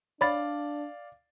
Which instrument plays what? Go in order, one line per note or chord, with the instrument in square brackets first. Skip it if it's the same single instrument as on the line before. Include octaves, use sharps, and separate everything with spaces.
[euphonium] D4 [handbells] C#5 B5 A6 [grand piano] D5 F5